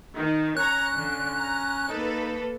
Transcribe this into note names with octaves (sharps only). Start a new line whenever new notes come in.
D#3 D#4
C#4 C#5 A#5 F#6
D3
A#5
A#3 D#4 A4 B4